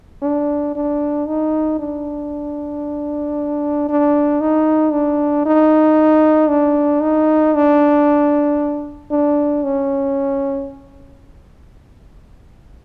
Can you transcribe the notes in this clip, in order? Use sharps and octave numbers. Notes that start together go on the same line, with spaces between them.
D4
D4
D#4
D4
D4
D#4
D4
D#4
D4
D#4
D4
D4
C#4